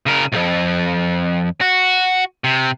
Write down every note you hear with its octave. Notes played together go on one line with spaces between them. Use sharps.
C#3 A#4
B1 F2
F#4
C3